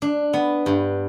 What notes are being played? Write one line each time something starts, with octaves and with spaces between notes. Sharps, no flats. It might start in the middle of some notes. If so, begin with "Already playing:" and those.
D4
B3
G2